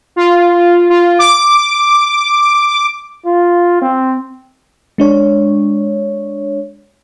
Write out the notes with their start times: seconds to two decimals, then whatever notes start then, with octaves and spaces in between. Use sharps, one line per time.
0.16 F4
0.90 F4
1.19 D6
3.26 F4
3.82 C4
4.98 G#3 D4 C#5